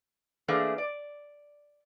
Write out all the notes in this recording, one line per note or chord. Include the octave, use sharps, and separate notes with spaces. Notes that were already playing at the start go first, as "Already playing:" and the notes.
E3 A3 A#3 D4 G#4
D5